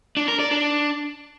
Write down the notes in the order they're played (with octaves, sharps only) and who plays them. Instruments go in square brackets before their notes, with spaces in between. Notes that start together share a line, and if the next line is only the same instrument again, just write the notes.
[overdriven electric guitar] D4
A#4
D5
D4